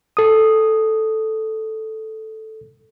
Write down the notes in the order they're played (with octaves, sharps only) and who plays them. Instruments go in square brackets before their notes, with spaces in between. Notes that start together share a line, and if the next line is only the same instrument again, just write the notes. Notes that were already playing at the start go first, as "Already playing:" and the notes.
[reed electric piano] A4 D#6